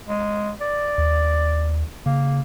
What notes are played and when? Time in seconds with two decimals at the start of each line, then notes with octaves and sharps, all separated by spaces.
0.08 G#3
0.61 D5
0.98 D#2
2.06 C#3 A#3